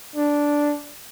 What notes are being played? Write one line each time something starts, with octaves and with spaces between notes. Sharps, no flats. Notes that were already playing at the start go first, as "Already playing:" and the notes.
D4